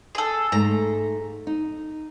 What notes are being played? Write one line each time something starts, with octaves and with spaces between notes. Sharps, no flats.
G#4 A4
G#2 A3 A#5
D#4